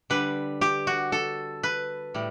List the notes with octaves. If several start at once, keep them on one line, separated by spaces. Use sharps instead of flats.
D3 G3 B4
G4
F#4
A4
B4
A2 G3